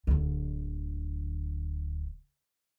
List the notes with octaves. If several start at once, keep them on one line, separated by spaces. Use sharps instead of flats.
D1 D3